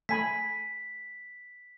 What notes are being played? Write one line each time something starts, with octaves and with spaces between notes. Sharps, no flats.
A3 G#5 B5 B6